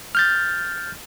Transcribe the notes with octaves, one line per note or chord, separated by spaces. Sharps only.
F6 G6 A6